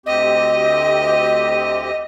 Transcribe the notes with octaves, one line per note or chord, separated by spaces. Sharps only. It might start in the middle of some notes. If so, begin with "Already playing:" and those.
D2 C4 G4 D#5